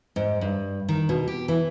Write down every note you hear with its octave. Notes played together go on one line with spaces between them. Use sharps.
G#2
G2
D#3
B2
G4
E3